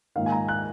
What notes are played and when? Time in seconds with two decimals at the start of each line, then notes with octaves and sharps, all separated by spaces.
0.16 A#1 G#2 D#3 F5
0.26 G#5
0.32 A#5
0.48 F#6